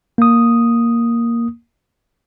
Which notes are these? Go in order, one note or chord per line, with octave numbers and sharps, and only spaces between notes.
A#3 D#6